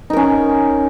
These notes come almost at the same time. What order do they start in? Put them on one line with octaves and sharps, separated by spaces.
D#4 A#4 C#4